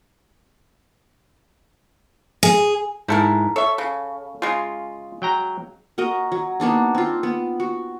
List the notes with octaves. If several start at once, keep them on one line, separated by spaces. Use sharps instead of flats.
G#4
G#2 D#4 E4 A4 A#4
A4 C#5 E5
C#3
C#3 G#3 F4
F#3 G5 A#5
F#4 A#4 D#5
F#3
A#3 B3 D4 D#4
C4 F4
B3
F#4